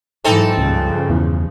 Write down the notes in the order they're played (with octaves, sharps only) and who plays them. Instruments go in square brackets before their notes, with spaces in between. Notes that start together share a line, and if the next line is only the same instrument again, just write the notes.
[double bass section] G#2 E3 F#3 [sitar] C4 D#4 A4
[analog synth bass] C#2 [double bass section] G2 C#3 F3
[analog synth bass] E2